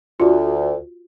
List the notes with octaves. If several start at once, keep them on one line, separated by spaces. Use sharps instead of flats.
D2 F4 F#4